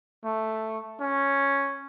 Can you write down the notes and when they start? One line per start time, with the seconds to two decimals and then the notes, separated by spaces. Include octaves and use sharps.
0.24 A3
1.01 C#4